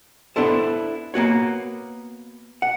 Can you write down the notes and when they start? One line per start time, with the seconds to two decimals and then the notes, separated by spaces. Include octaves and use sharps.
0.36 B3 D4 E4 A4 C5
1.14 A#3 B3 F#4 C#5
2.62 F#5